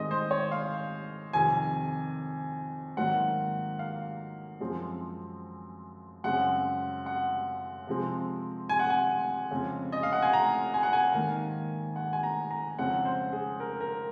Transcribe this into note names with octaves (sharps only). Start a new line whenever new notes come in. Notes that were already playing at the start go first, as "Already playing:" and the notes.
Already playing: G#2 D#3 G#3 C4 D#5
C5
C#5
F5
F2 C3 D#3 G#5
G#2 D#3 F#3 A#3 F#5
F5
F#2 F3 G#3 C4
F#2 C#3 G#3 C4 F#5
F#5
C3 F3 G#3 C4
G#5
F#5
G#5
F2 C#3 G#3 C4
D#5
F5
F#5
G#5
A#5
G#5
F#5
G#5
G#2 D#3 A#3
F#5
G#5
A#5
A#5
F2 C#3 G#3 C4 F#5
C5
G#4
A#4
A#4